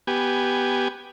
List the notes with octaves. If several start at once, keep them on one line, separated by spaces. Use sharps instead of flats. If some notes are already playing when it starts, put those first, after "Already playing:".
B3 G4 G#5